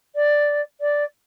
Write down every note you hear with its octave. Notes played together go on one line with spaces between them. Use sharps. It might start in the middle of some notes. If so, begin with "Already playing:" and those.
D5
D5